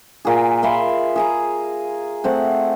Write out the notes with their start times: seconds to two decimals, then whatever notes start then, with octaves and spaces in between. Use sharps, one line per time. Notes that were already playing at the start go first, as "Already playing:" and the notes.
0.25 A#2 G#4
0.63 E5 F5 B5 C6
1.16 G#4 G#5 A#5
2.24 A3 C4 F#5